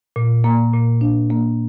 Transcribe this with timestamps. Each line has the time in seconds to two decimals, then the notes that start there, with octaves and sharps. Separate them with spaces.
0.16 A#2
0.44 A#3
0.73 A#2
1.01 D4
1.30 A#3